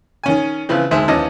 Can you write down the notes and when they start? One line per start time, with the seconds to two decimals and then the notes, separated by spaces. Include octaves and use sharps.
0.23 D#3 C#4 G#5
0.69 C#3 E3 F3 B3 C4
0.91 D2 D#3 G#3 C5 E5 D#6
1.08 D#2 E3 F3 C#4 D#5 A5